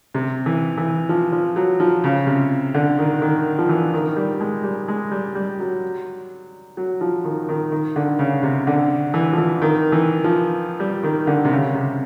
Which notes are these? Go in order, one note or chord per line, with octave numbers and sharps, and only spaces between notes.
C3
E3
E3
F3
F3
F#3
F3
C#3
C3
D3
D#3
D#3
F3
E3
D#3
G3
G#3
G3
G#3
G3
G3
F#3
F#3
F3
D#3
D#3
D#3
D3
C#3
C3
D3
E3
F3
E3
D#3
E3
F3
G3
D#3
D3
C3
C#3
C3